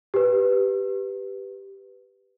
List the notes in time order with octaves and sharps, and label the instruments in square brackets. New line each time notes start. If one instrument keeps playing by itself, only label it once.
[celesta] G4 B4